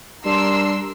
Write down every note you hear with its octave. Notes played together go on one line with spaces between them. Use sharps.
G3 D4 A#4 C6 E6